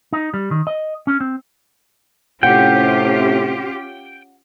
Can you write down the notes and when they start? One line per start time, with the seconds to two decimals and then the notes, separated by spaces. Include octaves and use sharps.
0.13 D#4
0.34 G3
0.51 D#3
0.67 D#5
1.07 C#4
1.20 C4
2.43 A2 C3 C#4 F4 G4 F#5 G5